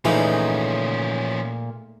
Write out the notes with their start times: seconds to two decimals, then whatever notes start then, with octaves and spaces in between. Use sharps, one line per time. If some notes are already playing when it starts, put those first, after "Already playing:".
0.05 A#2 E3 F3 G#3 A3 C#4 D#4